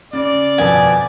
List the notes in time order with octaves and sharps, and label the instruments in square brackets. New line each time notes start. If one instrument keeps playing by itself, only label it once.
[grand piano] C#3 [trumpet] D5
[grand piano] G1 F2 B2 [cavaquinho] G#5